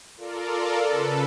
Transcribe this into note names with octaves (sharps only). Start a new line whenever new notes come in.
F4 A4 A#4 D5
C#3 A4 B4